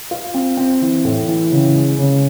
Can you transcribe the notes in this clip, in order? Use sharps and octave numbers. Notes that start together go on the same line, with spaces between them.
F4
C4
C4
E3
A2
E3
C#3
G#3
C#3